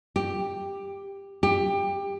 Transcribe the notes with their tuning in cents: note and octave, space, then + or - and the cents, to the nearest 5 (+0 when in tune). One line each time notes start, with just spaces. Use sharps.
G4 +10
G4 +20